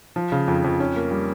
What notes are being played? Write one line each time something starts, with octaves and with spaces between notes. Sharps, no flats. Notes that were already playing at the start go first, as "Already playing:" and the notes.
F3
C#3
F2
F2
C#4
A#3
G3